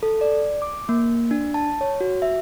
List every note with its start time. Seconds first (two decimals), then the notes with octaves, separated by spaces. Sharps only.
0.03 A4
0.21 D5
0.62 D6
0.89 A#3
1.31 D4
1.54 A5
1.81 C#5
2.01 F#4
2.22 E5